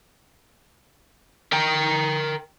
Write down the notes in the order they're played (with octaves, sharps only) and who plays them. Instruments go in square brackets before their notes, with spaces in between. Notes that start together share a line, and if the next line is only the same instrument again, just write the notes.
[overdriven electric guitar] A#4 G5